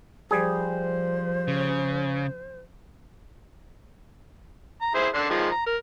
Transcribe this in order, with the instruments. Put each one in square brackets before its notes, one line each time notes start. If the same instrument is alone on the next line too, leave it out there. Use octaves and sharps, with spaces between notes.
[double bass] F3 [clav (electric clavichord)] G3 G#4 [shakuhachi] C5
[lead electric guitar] C#3
[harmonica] A#5
E4 G#4 C5
D3 D4 C6
D#3 F3 G#3
A#5
A#4